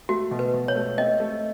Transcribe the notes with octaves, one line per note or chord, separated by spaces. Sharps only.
A3 F#4
B2
B4
B2
C#5
A3
C4 D#5
A3